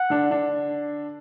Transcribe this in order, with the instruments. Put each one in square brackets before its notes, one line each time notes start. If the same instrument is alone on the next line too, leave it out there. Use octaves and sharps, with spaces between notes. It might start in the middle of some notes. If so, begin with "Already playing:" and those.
Already playing: [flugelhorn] F#5
[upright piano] D3 D4
D3 D4